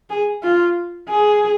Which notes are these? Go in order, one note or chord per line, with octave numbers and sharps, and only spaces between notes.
G#4
F4
G#4